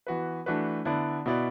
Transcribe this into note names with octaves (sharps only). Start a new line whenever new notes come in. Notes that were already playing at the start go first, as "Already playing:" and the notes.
E3 B3 F#4 B4
E3 A3 D4 F#4 B4
D3 B3 E4 D5
B2 B3 E4 D5